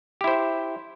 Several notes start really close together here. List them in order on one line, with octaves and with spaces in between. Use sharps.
G4 E4 C5 E5